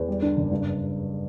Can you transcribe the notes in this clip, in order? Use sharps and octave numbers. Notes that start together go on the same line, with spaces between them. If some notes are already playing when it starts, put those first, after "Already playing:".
Already playing: E2
G3
D3
F#1
G2